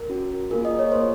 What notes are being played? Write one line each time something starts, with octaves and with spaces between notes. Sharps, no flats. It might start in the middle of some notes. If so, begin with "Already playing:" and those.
Already playing: A#4
C#4 F#4
A#3 F4 G#4 A#4
D#5
C#5
A#3 F4 G#4 C5